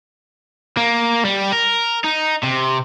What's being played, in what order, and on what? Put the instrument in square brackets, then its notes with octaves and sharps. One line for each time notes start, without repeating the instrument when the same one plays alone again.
[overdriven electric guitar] A#3
G3
A#4
D#4
C3